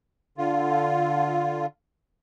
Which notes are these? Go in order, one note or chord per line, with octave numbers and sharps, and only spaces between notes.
D3 F4